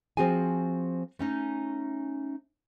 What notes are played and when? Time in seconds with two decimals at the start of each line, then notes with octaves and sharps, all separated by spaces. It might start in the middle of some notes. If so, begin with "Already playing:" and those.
0.17 F3 C4 F#4 G#4 G#5
1.19 A3 C#4 D#4